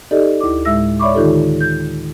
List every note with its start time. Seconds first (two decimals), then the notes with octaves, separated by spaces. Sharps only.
0.11 D#4 G4 A4 D5 D#5
0.41 D2 E4 D6
0.65 A2 G#3 E5 E6 A#6
1.00 C#5 D5 E5 B5 C#6 D6
1.15 D3 D#3 D#4 F4 G4 A4
1.61 G6